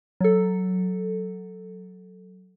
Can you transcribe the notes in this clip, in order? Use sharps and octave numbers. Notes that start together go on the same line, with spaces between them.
F#3 A4